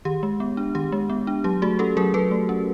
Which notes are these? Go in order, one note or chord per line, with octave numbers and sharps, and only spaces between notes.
D#3 G4
G#3
B3
D4
D#3 G4
G#3
B3
D4
F#3 G4
A3 F#4 G#4
C#4 G4 A4
F#3 G#4 A#4
F#3 A4 B4
A3
C#4